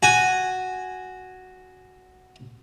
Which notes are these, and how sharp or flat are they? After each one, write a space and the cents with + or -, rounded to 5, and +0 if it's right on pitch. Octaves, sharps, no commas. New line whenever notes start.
F#4 +0 G#5 +0